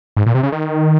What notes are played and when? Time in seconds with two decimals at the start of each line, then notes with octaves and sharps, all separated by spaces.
0.17 G#2
0.26 A#2
0.35 C3
0.43 C#3
0.52 D#3